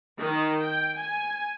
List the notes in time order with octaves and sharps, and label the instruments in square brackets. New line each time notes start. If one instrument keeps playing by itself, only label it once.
[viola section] D#3
G5
G#5